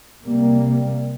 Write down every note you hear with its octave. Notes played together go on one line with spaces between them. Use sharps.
C3 G3 A#3